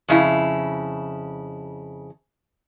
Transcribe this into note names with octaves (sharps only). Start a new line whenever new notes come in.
F2 C#3 E4